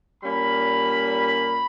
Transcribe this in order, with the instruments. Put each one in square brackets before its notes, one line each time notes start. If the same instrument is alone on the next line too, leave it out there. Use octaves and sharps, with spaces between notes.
[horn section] A#2 G3 A#3 C#4 B5